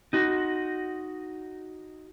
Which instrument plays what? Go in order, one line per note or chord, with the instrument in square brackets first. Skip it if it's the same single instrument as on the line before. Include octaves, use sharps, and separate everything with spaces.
[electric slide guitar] D#4 F#4